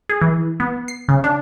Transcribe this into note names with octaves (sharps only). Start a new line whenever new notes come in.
G#4
E3
B3
C7
C#3
D4